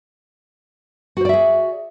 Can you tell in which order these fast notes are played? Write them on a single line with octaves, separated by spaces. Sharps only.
F#4 C5 D5 E5 G#4